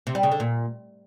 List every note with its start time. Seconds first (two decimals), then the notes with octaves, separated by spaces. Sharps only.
0.07 C3
0.15 G3
0.23 C#3
0.32 D3
0.40 A#2